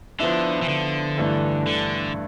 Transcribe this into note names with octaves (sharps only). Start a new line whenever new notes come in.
D3 F3 B3 E4
E3
D3
G2 E3 A3 D4 A4
D3